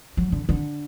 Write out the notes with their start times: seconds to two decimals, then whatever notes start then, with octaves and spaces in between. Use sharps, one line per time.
0.17 F#3
0.32 D3
0.49 D3